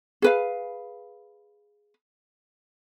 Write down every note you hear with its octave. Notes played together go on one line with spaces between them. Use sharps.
G#4 B4 F5